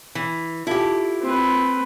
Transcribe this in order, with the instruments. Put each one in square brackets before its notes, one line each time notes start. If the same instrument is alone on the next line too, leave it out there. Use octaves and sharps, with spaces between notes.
[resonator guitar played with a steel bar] E3
[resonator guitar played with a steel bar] E4 G4 [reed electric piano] F4 [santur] A4
[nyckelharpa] C4 B4